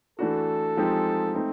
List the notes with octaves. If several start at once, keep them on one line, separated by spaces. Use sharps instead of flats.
E3 A3 D4 F#4 A4
F3 G#3 C4 D#4 G4
A3 C4 D#4